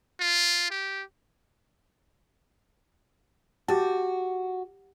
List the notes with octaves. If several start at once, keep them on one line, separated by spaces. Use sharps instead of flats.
F4
G4
F#4 G4 A5